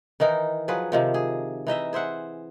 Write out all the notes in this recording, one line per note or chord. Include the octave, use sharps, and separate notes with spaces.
D#3 E3 D#4 A#4
F3 F#3 G#4 B4
C3 D#3 F3
G#4
E3 D#4 D#5 E5
G#4 C5 E5 F#5